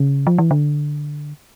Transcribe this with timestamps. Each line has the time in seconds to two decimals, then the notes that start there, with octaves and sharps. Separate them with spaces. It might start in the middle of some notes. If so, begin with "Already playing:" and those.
Already playing: C#3
0.27 F3
0.38 E3
0.51 D3